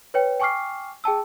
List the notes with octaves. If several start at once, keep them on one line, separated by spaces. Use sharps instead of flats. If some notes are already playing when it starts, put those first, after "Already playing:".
B4 C#5 G5
G5 G#5 C#6 D6 F6 C7
G#4 G5 A5 E6